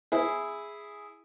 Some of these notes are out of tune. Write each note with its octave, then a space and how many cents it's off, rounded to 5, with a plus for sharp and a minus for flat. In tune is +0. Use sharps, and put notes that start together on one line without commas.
E4 +0 G#4 +0